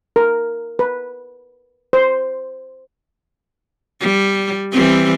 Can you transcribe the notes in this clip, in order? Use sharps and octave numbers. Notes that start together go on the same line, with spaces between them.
A#4
B4
C5
G3
E3 G3 C4